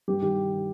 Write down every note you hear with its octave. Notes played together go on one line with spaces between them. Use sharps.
G2 G4
D#3 G4